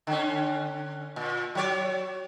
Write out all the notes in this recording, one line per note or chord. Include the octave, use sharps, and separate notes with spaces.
D3 C#4
A#2
F#3 C#5 D5